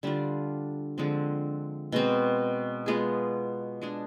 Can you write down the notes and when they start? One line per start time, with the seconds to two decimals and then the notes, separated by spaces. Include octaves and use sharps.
0.03 D3 G3 D4 F4
0.98 D3 F3 G#3 C4
1.92 B2 G#3 C4
2.86 G#3 B3 F4 G#4
3.82 G#3 D4 G#4